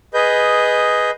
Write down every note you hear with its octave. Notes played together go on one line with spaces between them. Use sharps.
G#4 B4 D#5 G6